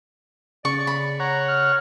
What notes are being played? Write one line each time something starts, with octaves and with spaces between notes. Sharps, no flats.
C#3 D5 C#6
B5
C#5 F#5 A#5
F6